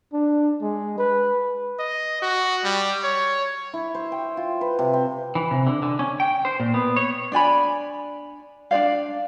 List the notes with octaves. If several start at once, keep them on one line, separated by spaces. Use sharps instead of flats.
D4
G#3
B4
D#5
F#4
G3
C#5
E4
C5
G5
F4
B4
C3
C4
E3
C3
D3
D3
C#4
G5
C5
A#2
B3
C#5
D4 D5 G#5 B5
D4 F#4 D5 F5